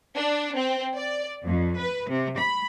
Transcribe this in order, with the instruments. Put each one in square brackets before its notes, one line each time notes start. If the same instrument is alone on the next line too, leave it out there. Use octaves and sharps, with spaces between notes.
[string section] D4
C4
D5
F2
B4
C3
B5